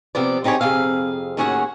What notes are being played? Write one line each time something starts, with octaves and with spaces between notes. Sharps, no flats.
C3 F3 B3 D5
C4 D#4 G4 G#4 C#5
F2 C3 G#4 F5
D#2 A2 C#4 F#4 G#4 F#5